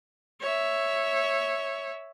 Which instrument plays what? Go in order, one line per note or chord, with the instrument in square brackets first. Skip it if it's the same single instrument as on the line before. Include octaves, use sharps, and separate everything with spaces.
[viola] C#5 E5